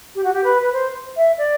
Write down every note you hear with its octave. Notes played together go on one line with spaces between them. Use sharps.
G4
F#4
G4
B4
B4
C5
E5
D5